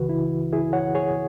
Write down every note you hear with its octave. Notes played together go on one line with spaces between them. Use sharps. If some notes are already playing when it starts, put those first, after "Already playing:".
Already playing: C#2 C#3 E3 F#4 B4
E4
E4 G#4
C#5 F#5
G#4 C#5